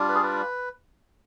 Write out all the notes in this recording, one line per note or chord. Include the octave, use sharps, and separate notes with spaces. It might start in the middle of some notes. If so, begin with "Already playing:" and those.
Already playing: G3 D4 F4
B4
G#4
B4